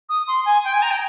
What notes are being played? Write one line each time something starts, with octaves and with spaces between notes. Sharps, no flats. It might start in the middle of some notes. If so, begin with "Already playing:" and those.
D#6
C6
G#5
G5
G#5
A#5
G5